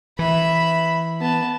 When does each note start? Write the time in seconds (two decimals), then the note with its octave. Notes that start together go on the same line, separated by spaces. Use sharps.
0.19 E3 E5 B5
1.21 B3 A5